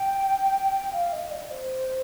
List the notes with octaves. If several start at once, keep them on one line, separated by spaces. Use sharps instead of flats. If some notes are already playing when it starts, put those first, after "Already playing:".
Already playing: G5
G5
F5
D#5
D5
C5